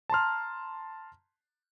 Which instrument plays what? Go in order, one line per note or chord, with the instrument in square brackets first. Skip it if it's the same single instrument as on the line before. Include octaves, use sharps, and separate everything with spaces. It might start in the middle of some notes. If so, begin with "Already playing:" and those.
[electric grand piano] A5 A#5 C6 F6